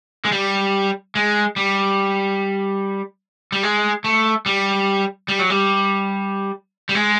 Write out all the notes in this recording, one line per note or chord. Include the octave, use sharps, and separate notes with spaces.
G#3
G3
G#3
G3
G3
G#3
A3
G3
G3
F#3
G3
G3
G#3